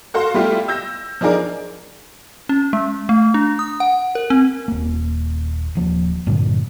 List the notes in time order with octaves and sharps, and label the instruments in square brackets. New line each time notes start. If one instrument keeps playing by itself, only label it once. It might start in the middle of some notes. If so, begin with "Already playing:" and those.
[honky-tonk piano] F#4 A4 F5 C6
G3 A3 E4 F4 G4
E6 G6 A#6
F3 D4 D#4 G#4 A#4 D5
[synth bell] C#4
G#3
A3
D4
D#6
F#5
A#4
C4
[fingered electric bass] D#1 A#3
D#1 F3 A#3
G2 A#2 D3 F#3